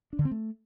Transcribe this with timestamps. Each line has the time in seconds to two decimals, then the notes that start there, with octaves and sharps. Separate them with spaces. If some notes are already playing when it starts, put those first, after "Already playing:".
0.13 D4
0.19 D3
0.25 C4
0.31 A3